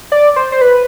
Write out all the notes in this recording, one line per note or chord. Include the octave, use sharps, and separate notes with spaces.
D5
C5
C5
B4